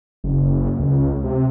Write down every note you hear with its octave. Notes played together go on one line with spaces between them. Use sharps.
F#1
C#2
C3